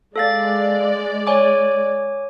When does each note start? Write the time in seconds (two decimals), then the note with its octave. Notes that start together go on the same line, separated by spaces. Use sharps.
0.16 G#3 A4 D5 F5 A6
1.27 C#5 G#5 D6